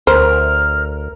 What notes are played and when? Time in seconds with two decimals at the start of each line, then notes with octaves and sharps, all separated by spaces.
0.07 D2 A#4 C5 F6